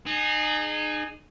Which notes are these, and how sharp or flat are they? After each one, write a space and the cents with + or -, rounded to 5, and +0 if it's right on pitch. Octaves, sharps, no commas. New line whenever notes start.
D#4 -35 G#4 +0